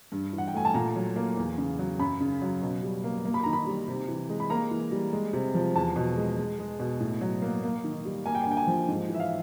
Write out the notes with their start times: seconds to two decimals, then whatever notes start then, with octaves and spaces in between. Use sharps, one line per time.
0.12 G2
0.33 E3
0.38 F#5
0.48 G5
0.54 A3 G#5
0.65 A5
0.74 A#2 A#5
0.96 F#3
1.16 A#3
1.37 E2
1.58 C#3
1.79 F#3
1.99 F#2 B5
2.20 C#3
2.42 F#3
2.62 B2
2.83 G3
3.04 A#3
3.25 A#3
3.34 B5
3.43 D#3 A#5
3.53 B5
3.66 G3
3.88 C3
4.08 E3
4.29 G#3
4.40 B5
4.50 A#3 A#5
4.71 E3
4.92 G3
5.13 G#3
5.33 C3
5.54 F3
5.75 E2 A5
5.96 B2
6.17 G#3
6.38 G#3
6.59 G#3
6.80 B2
7.00 A2
7.21 F#3
7.42 A#3
7.63 A#3
7.84 D#3
8.05 G3
8.26 A#3 G#5
8.35 G5
8.44 G#5
8.47 D3 G5
8.57 G#5
8.67 F3
8.88 G#2
9.09 E3
9.14 E5
9.20 F5